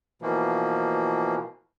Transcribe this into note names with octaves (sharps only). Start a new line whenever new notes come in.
B2 E3 F3 A#3